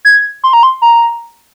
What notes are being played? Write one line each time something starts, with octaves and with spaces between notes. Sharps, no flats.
G#6
C6
A#5
C6
A#5